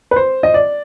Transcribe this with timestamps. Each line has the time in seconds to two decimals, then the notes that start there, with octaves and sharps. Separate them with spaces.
0.11 B4
0.16 C5
0.43 D#5
0.54 D5